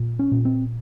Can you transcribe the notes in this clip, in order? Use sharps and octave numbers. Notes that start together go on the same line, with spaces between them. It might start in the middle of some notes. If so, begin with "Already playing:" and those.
Already playing: A#2
C#4
A#2
C4